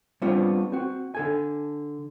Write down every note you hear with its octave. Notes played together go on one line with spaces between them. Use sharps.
G3 B3 C4 D4 F4 C#5
C4 F#4
D3 A4 G#5